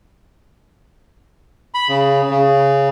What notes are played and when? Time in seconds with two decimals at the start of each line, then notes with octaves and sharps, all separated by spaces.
1.74 B5
1.89 C#3
2.30 C#3